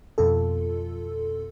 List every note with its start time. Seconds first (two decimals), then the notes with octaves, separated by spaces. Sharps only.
0.18 F2 B2 F4 A4